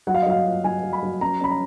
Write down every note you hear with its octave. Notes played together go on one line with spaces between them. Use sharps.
F#3 F#5
F5
D#5
F#3 F5
F4
F#3 G#5
F#3
B5
F#3
C#4 A#5
C#4 B5
A#5